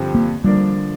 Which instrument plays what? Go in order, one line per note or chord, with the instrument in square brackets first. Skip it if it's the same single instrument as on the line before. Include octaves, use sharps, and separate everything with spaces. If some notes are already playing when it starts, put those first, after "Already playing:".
Already playing: [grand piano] G2 D3 F3 C4 G4
[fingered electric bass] A#3
[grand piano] D3 F3 D4 A#4 D5 [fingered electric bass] G3